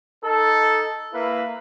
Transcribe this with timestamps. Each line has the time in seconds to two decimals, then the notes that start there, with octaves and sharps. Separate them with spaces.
0.24 D#4 A4
1.13 A#3 E4 B4